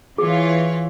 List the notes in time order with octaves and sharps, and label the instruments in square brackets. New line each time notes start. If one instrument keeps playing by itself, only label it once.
[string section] E3 F4 C#5 [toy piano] G#4